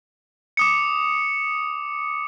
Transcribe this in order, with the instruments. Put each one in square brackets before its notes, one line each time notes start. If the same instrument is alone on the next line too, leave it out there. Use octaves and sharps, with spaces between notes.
[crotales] D6 D#6 C#7